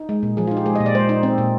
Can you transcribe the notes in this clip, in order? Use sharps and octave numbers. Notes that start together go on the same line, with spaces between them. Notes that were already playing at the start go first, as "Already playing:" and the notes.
Already playing: D#4
G#3
A#2
F3 G#4
F4
D#4
G4
G#3 G#4
D#5
A#2
D5
G#3 C5
D#4
C4
A#2